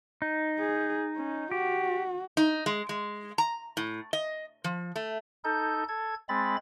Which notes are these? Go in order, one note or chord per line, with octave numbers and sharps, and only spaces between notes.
D#4
G#4
C#4
F#4 G4
D#4
G#3
G#3
A#5
A2
D#5
F3
A3
D#4 A4 G6
A4 G#6
G#3 C4 B5 A6